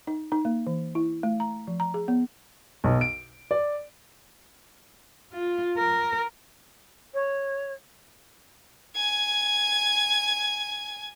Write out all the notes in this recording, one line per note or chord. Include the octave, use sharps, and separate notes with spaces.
D#4
D#4
A#3
E3
E4
A3
A#5
F3
A#5
G#4
B3
B1
D7
D5
F4
A#4
C#5
G#5 G#6